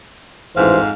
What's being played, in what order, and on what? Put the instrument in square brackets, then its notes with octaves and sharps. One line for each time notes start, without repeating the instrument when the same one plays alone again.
[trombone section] A1 E3 C5 [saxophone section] F2 G#2 F5